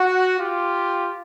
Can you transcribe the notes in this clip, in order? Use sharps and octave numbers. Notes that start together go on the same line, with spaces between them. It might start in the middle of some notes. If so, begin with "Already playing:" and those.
Already playing: F#4
F4 G4